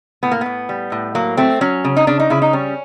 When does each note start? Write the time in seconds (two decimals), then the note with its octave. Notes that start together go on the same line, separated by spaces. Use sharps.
0.23 A2 B3
0.31 A#3
0.41 A2 B3
0.69 G3
0.92 A2
1.15 F#3 A#3
1.37 A3 C4
1.61 F#3 C#4
1.85 C#3
1.97 D#4
2.07 C#3 D4
2.20 D#4
2.30 C#3 E4
2.42 D#4
2.53 G3 C#4